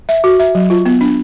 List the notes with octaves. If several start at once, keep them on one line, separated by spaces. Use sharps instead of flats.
E5
F#4
E5
F#3
F4
B3
D4